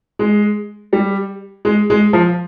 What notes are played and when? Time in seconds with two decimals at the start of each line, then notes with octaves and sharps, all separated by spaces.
0.19 G#3
0.93 G3
1.65 G#3
1.90 G#3
2.13 F3